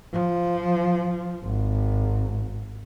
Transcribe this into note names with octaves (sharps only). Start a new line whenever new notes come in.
F3
G#1